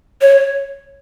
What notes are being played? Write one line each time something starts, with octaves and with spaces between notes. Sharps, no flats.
C#5